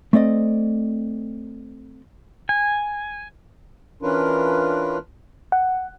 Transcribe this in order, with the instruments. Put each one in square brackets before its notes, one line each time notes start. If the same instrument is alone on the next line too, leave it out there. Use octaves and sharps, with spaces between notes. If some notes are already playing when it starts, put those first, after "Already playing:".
[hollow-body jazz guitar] A3 C4 D5 D#5
[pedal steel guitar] G#5
[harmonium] E3 C#4 D4 F4 A#4 B4
[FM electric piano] F#5